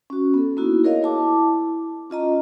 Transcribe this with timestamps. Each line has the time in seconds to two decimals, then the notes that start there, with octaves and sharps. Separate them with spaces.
0.10 C#4 F#4
0.34 B3 A4
0.57 A#3 B3 D#4 E4 F#4
0.84 G#4 A#4 C#5 D#5 F5
1.03 E4 A5 D6
2.10 C#4 F4 D#5 A#5